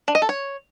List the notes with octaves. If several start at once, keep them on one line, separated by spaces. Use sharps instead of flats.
D4
D#5
A4
C#5